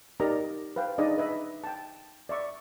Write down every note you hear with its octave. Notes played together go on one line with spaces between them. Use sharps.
D#4 G4 A#4 D5 D#5 A#5
B4 C5 F5 G5
D4 D#4 G#4 D5 D#5
B4 D#5 E5 B5
G5 A5
D5 E5 C#6